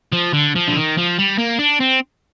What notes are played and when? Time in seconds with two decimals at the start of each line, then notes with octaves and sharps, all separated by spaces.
0.13 F3
0.34 D3
0.56 F3
0.68 D3
0.76 D#3
0.97 F3
1.18 G3
1.38 A#3
1.59 D4
1.80 C4